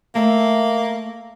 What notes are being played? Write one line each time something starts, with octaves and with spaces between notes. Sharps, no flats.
A3 A#3 E5